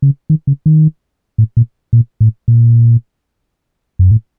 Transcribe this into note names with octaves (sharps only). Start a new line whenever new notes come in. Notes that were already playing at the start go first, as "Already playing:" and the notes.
C#3
D#3
C#3
D#3
A2
A#2
A#2
A2
A#2
F#2
A2